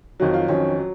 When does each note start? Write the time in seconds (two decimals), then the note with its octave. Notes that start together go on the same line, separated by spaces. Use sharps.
0.20 F2 D#3 F#3 F#4
0.34 F4
0.48 F2 D#3 F#3 C#4
0.79 F#3